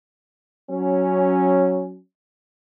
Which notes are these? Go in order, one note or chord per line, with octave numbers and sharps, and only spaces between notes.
F#3 C#4